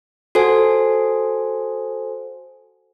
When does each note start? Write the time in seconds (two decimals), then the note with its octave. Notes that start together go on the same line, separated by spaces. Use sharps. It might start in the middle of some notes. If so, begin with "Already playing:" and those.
0.35 F#4 A4 C5 G#5